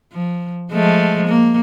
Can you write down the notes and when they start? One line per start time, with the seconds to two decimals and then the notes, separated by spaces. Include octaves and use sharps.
0.13 F3
0.71 F3 G#3 A3
1.27 A#3